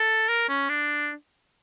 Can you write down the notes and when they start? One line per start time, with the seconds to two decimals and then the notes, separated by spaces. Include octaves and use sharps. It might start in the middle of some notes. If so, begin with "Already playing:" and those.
Already playing: A4
0.29 A#4
0.49 C#4
0.69 D4